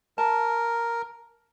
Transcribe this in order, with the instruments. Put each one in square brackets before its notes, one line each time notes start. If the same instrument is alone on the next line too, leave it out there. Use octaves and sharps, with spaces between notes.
[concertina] A#4 [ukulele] A5